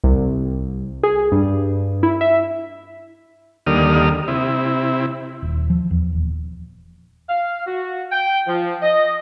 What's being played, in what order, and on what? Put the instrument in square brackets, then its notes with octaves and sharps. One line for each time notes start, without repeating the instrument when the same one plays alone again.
[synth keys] C2
G#4
G2
E4
E5
[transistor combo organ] D#2 D3 G3 A#3 D#6 F6
C3 E4
[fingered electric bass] D#1
F3
E2
D#1
[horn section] F5
F#4
G5
F3
D#5